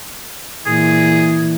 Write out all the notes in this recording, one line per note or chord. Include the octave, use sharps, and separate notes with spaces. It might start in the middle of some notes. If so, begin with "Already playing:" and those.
A#2 E3 G#4